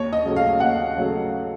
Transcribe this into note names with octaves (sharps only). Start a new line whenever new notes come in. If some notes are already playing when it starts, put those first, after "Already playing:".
Already playing: D#2 C#5
D#5
C#3 F#3 A3
F5
D#2 F#5
C#3 F#3 A3